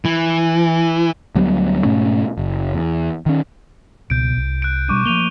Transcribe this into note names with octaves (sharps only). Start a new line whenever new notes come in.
E3
D2 F#3 G3 B3
G#2 B2 A3 C#4
F#1
E2
D#3 C#4
C#2 B2 G6 D7
C2
F#6 D7
B2 G3 D4 C#6 D6 D#7
F3 A3 A#3 D#7 F7 G7